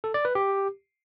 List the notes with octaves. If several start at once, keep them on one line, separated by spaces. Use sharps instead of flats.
A4
D5
B4
G4